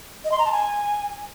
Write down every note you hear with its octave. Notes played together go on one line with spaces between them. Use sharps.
D#5
C6
A#5
A5
G#5